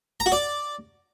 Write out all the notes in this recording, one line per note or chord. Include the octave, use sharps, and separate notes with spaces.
A#5
F#4
D5